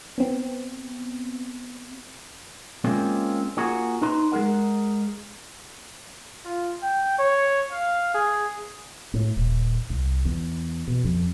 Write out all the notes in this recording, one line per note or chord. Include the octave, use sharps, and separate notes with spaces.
B3 C4
G#3 A#3 C4 C#4 F4
A#3 F4 F#4 G#4
D#4 B4 C6
G#3 G#4 A#4 F#5
F4
G5
C#5
F5
G#4
A2
D#1
C2
E2
B2
F2